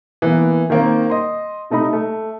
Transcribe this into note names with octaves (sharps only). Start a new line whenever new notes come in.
E3 A#3 B3
D#3 A#3 C4
D#5 C6
C3 A3 D#4 D#5 B5
A3